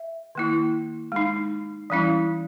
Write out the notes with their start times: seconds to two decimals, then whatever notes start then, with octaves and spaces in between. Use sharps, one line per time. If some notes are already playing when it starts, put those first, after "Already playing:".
Already playing: E5
0.35 D#3 A#3 E4
1.12 G#3 D#4
1.90 E3 G3 C#4 E4